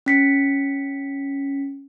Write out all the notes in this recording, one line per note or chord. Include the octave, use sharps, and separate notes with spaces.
C#4 B6 C#7